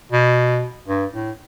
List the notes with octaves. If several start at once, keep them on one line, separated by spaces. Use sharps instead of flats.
B2
G2
A2